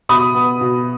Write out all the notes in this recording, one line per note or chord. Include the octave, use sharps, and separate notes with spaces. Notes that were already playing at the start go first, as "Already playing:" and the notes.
B2 B5 D#6
B3
B2